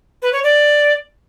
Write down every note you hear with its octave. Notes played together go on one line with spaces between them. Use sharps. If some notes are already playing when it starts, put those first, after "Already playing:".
B4
C#5
D5